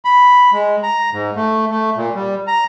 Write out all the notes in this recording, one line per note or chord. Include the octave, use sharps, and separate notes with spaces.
B5
G#3
A#5
G#2
A3
A3
A#2
G3
A#5